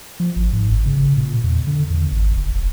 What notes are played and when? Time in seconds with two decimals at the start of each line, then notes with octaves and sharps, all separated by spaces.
0.20 F3
0.36 G#1
0.53 G#2
0.71 G1
0.86 C#3
1.17 A#2
1.44 E2
1.67 D3
1.90 E2
2.12 G#1
2.36 E1